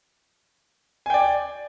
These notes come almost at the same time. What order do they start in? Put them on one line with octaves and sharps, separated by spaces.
G#5 G5 D5